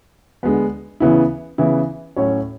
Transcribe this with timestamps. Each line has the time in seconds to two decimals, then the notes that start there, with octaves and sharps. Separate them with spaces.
0.43 D3 G#3 B3
1.00 C#3 E3 B3 E4
1.58 C#3 E3 B3 E4
2.16 A2 F#3 C#4 F#4 C#5